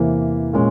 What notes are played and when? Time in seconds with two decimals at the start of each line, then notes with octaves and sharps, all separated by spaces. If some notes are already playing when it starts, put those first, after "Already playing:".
Already playing: E2 C3 E3 A#3
0.53 A#2 G#3 C#4